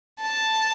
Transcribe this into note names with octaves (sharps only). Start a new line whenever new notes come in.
A5